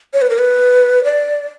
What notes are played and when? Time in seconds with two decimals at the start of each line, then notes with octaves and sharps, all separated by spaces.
0.14 C#5
0.22 B4
0.30 A#4
0.38 B4
1.04 D5